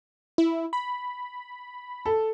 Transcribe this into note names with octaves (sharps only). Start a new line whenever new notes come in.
E4
B5
A4